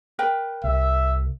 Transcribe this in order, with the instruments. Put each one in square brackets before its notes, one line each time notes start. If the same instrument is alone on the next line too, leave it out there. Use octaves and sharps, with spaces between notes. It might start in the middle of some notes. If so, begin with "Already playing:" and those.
[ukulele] A#4 B4 G5
[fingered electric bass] C2 [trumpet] E5